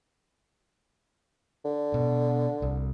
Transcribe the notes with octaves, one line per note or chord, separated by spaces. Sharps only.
D3
B2
C2